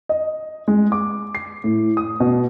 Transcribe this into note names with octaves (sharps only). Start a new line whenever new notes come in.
D#5
G#3
D6
C7
A2
D#6
B2